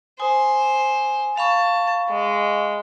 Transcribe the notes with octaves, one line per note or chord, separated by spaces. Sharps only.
C5 G#5 D#6
F5 A5 B5 C#6
G#3